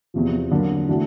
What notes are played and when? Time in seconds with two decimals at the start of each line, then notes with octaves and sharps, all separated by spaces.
0.14 E2 C3 F3
0.51 D3 F#3 A#3
0.88 E3 A3 D4 F#4